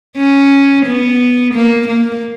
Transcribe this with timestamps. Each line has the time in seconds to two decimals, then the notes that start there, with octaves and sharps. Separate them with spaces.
0.18 C#4
0.86 B3
1.54 A#3
1.88 A#3